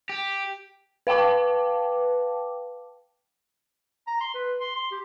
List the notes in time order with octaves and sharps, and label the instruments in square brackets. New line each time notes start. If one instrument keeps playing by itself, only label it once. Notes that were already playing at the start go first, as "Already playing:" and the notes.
[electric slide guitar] G4
[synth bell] B4 F5 G5 A5 D6
[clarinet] A#5
C6
B4
C6
C6
G4